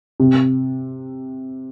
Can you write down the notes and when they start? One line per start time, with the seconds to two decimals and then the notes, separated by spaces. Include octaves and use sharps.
0.20 C3